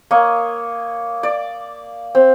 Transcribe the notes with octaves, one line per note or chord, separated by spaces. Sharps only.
A#3 C#5 D#5
D5
C4